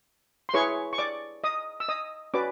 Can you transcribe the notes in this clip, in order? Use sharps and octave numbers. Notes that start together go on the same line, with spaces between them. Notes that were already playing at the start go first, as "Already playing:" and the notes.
C6
E4 G#4 B4 C#5 C#6
C#6
D5 D6
D#5 D#6
E6
D#5 D#6
C#4 F#4 B4 D5 D6